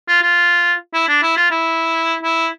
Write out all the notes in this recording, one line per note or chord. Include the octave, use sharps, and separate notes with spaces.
F4
F4
E4
D4
E4
F4
E4
E4